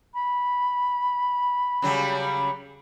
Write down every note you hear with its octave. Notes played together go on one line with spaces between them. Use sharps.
B5
C#3 F#3 G3